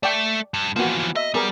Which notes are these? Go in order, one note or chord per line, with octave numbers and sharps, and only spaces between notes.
A3 D5 G5
G2
E3 F3 A#3 B3 F#4
D#5 E5
G3 B3 G#4 A#4